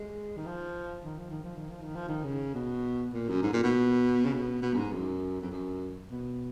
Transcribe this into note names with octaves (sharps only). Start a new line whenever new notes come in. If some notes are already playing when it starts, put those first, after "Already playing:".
Already playing: G#3
D#3
F3
D#3
F3
D#3
F3
D#3
F3
D#3
F3
D#3
C#3
B2
A#2
F#2
G#2
A#2
B2
C#3
B2
B2
F#2
G#2
F#2
F2
F#2
B2